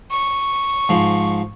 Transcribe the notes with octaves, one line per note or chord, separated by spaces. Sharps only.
C#6
G#2 F3